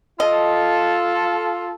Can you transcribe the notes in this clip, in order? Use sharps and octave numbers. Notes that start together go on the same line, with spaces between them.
F4 A4 D#5